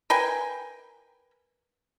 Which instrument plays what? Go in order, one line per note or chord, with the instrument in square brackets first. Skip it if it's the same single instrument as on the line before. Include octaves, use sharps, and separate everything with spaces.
[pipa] A#4 B4 G5 G#5